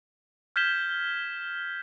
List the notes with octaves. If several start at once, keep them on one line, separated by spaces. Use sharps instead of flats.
F6 G6 G#6 B6 E7 G7